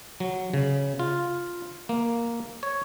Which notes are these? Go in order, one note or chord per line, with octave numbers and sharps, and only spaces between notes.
F#3
C#3
F4
A#3
C#5